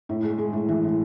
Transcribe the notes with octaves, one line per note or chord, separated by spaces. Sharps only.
A2
G#3
G#3
A2
E3
A2